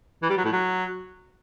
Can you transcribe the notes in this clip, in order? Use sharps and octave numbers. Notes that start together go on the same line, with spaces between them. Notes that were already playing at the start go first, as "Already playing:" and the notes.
E3
G3
F#3
A2
F#3